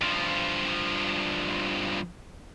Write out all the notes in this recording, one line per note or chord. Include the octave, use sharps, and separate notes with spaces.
G2 F3